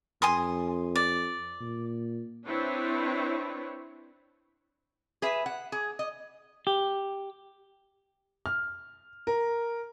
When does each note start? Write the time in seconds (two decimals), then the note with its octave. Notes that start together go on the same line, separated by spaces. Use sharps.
0.22 F2 G#5 C6 D#6
0.96 D5
1.60 A#2
2.46 C4 D4 E4 B4 C#5
5.22 G#4 B4 E5
5.46 F#5
5.72 G#4
5.99 D#5
6.67 G4
8.46 F6
9.27 A#4